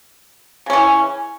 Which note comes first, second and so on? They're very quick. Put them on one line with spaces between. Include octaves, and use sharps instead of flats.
C#3 C#4 E3